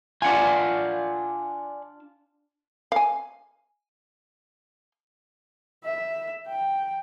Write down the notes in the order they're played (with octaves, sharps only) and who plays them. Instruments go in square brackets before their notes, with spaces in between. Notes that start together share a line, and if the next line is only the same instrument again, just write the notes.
[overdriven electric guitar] D4 F4 [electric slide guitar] D5 F#5 G#5
[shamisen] F5 G#5
[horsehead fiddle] E5
G5